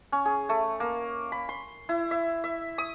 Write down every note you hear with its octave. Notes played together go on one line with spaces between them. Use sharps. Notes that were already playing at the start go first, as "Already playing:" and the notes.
C#4
G#4
A3
A#3
B5
C6
E4
E5
E5
D#6